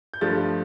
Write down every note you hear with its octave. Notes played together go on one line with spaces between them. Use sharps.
G6
G2 F3 A3 A6